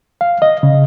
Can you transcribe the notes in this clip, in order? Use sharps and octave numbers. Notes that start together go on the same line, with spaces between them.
F5
D#5
C#3